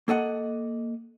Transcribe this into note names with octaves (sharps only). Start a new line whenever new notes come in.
A#3 A4 D#5 F#5